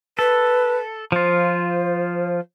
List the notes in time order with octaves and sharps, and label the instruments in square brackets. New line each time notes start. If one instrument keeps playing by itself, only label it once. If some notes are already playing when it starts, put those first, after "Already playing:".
[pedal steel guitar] A4 [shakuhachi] B4
[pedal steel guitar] F3 F4 [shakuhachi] C5